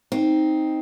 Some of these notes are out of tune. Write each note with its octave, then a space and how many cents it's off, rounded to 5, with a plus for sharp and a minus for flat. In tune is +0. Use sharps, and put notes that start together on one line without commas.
C4 +0 D#4 +5